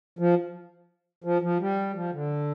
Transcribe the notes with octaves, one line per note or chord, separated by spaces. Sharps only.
F3
F3
F3
G3
F3
D3